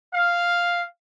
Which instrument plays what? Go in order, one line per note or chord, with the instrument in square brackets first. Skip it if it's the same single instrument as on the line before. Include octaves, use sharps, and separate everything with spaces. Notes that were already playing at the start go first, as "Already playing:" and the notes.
[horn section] F5